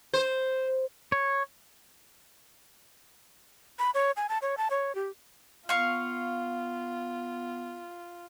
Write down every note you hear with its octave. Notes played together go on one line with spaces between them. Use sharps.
C5
C#5
B5
C#5
G#5
A5
C#5
A5
C#5
G4
B3 F4 F5 C#6